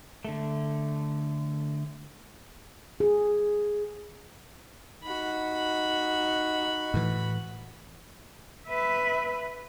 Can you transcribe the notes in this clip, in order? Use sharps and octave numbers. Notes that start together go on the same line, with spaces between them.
D3 A3
G#4
D#4 F#4 B5
A2 E3
B4 E5